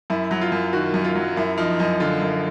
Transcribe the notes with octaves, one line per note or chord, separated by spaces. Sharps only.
F#2 E4
F#3
F4
F#2
D#3 F#4
F#2
F4
F#3
F#2 E4
F3 D#4
F#2 D#4
D3 F4
F#2